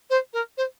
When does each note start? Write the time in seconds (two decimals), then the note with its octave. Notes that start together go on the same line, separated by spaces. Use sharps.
0.10 C5
0.33 A#4
0.57 C5